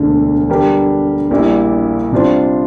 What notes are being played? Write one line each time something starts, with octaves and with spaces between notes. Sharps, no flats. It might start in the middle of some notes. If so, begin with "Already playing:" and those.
Already playing: E1 D2 D3
D3 G3 D4 G4 A#4
A#1 A#2 G3 A#3 E4
C3 G3 D4 F4 C5